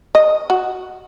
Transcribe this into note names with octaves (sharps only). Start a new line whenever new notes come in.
D#5
F#4